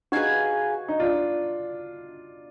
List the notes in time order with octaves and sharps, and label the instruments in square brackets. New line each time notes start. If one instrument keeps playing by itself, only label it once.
[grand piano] D#4 F#4 [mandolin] G#4 B4 F5 G#5
[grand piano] D#4
D4 F4